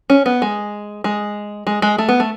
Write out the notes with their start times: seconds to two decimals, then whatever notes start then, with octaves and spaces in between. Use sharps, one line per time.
0.10 C#4
0.26 B3
0.42 G#3
1.04 G#3
1.67 G#3
1.82 G#3
1.98 A3
2.09 B3
2.20 A3